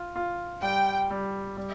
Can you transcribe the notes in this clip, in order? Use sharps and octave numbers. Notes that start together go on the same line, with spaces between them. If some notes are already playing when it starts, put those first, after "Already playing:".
Already playing: F4
F4
G3 G5
G3
G3